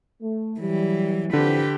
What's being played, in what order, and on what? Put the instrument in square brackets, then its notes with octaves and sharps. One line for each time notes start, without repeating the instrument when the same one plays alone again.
[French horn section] A3
[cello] E3 F#3 [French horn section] G3
[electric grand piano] D3 [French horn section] E3 F3 C4 [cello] G4 B4